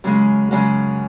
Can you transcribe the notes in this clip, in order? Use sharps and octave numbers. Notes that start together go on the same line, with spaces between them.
F#2 C#3 G#3
F#2 C#3 G#3